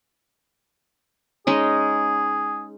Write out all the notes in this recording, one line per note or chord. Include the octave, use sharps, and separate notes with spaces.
G#3 C#4 D#4 G#4